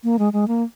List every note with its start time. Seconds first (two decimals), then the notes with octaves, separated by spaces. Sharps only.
0.04 A#3
0.19 G#3
0.33 G#3
0.48 A#3